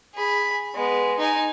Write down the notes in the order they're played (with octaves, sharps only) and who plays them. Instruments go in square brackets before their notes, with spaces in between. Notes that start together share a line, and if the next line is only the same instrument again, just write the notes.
[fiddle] G#4 B5
G#3 B3
D#4 G#5